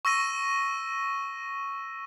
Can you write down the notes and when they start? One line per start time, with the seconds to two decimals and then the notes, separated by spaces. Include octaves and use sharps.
0.05 C#6 E6 A#6 D#7